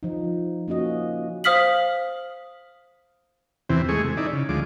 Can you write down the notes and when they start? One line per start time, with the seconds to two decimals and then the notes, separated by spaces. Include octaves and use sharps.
0.03 F3 D#4
0.68 A#3 C#4 F#4 D#5
1.44 C5 F5 D#6 F6 B6 F#7
3.69 E2 C3 E3 C4
3.89 G#3 A3 G#4 C#6
4.03 C3
4.17 D#4 E4 D5
4.33 C#3
4.49 D2 F3 G#3 D6